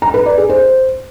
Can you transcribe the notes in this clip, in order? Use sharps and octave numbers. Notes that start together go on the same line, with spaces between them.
A#5
B4
D5
G#4
C5